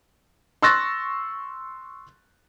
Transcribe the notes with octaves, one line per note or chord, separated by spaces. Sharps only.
C6 C#6 E6 F#6 A6 A#6